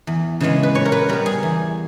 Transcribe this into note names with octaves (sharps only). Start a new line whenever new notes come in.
E2
C#3 E3 G#3 B3
B4
A#2 C#5
A#4
B4
G3 B3 A#4
G#4
E2